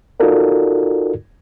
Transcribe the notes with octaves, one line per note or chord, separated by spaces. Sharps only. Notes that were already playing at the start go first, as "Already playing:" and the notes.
D#4 F4 F#4 A4 A#4 D5